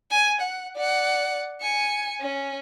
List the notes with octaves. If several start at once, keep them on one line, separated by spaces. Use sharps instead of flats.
G#5
F#5
D5 F#5
G#5 C#7
C#4